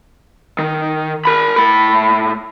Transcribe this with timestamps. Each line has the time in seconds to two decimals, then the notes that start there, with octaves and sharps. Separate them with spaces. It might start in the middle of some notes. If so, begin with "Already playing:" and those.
0.59 D#3
1.25 A#4 B5
1.56 A2 B5